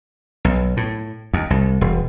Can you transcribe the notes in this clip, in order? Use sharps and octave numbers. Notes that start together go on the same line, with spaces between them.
B1
A2
D#2
C2
E1